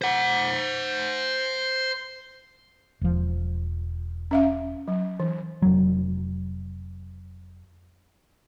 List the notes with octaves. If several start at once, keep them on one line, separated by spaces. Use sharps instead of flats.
C5 F#5
E1 F3
C#4 E5 F5
F#3
E3
F1 F#3